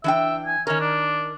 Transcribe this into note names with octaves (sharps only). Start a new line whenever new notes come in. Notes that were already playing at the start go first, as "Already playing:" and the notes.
E3 D4 E5 G5
G#5
D#3 C#4 A#4
D4